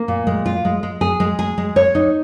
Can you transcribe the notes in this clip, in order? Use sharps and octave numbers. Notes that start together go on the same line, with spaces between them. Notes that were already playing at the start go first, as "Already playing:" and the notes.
Already playing: A#3
A#2
G#3
F4
G#3
G#3
G#4
G#3
G#4
G#3
C#5
D#4